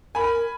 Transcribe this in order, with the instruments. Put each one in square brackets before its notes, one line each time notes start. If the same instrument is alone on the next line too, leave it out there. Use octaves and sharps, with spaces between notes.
[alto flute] A#4 [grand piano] G#5 B5